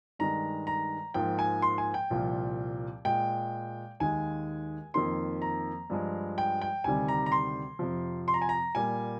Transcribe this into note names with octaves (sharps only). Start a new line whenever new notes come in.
G2 D#3 G#3 A#5
A#5
G#2 F3 A#3 G5
G#5
C6
G#5
G5
C2 A#2 F3
A#2 G#3 G5
D#2 D#3 G#3 G#5
F2 D#3 A#3 C6
A#5
G2 F3 G#3
G5
G5
D2 C3 D#3 G3 G#5
A#5
A#5
C6
F2 C3 F3
C6
A#5
G#5
A#5
A#2 G3 A#3 G#5